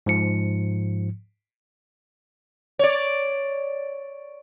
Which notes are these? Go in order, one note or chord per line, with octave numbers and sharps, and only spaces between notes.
G#2 F3 C#7
C#5 D5